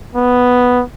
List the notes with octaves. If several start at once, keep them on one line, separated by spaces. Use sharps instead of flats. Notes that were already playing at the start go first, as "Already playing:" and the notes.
B3